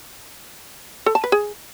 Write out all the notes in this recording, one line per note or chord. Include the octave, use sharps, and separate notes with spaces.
A4
A5
B4
G#4